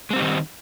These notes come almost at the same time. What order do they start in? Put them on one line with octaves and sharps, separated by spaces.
G#3 C4 G3 D#4 D#3